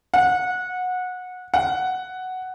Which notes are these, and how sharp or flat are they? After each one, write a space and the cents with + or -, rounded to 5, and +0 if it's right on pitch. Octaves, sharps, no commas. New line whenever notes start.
F#5 -20
F#5 +5